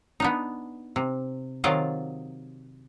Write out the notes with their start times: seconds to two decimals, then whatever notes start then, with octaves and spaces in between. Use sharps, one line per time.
0.20 B3 D4 D#4
0.96 C3
1.64 C3 D#3 F#3 F4 D5 D#5